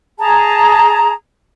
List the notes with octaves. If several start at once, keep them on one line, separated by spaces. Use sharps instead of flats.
G#4 A5 A#5